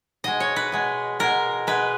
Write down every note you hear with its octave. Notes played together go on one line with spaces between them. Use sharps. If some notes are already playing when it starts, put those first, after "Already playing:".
B2 G#3 D#5
C#5
B4
B2 G#3
B2 G#3 A#4
B2 G#3 B4